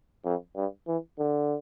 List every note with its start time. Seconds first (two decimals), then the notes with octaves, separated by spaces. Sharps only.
0.24 F2
0.56 G2
0.87 E3
1.19 D3